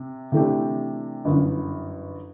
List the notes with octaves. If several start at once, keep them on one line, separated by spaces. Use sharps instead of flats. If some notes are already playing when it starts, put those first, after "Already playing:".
Already playing: C3
C3 E3 A3 D4 G4
G1 F#2 E3